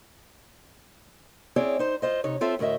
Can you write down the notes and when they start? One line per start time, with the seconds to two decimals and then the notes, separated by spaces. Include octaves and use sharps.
1.56 C4 C#4 E4 G#4 C#5 D5
1.79 D#4 C5
2.02 F4 C5 D#5
2.24 C3 D#4 C#5
2.41 C4 F4 A4 E5
2.59 D2 A2 A#4 D#5 E5